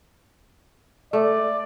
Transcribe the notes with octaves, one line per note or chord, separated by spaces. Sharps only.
A3 D5